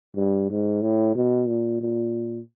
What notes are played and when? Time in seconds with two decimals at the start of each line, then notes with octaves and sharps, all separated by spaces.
0.16 G2
0.50 G#2
0.82 A2
1.16 B2
1.47 A#2
1.81 A#2